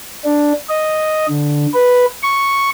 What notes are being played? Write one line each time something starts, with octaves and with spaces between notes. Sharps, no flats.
D4
D#5
D3
B4
C#6